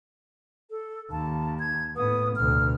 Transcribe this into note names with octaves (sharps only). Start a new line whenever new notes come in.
A4
D#2 A5
G#6
A2 B3 D#6
D2 B2 F6